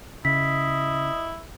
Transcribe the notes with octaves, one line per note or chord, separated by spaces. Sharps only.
C#3 E4 D#5 B6